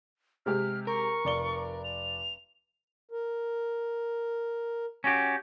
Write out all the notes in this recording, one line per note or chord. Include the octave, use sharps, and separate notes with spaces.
C3 G#3 G4 F6
A#4 C#6
F1 D5 G7
F7
A#4
C#4 F#4 G4